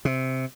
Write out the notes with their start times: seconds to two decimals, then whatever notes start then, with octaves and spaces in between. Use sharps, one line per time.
0.05 C3